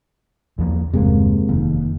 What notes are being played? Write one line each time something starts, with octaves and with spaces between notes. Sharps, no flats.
E2 F3 A#3
G1 E2 C3 G#3 A#3
F1 D#2